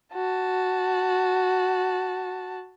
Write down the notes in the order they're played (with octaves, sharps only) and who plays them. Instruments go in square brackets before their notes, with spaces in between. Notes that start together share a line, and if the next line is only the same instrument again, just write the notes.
[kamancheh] F#4 A5